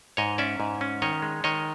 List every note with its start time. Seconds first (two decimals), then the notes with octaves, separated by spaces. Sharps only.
0.17 G#2 C#5 D#5
0.38 C#4 D5 E5
0.60 G#2
0.81 C#4
1.02 D#3 C#5 D#5
1.22 G#3
1.44 D#3 C#5 D#5